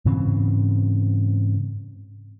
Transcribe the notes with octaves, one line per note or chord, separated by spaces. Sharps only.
G#2 C#3 E3 C4